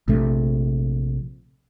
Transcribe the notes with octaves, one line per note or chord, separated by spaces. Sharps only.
A#1 C3 A3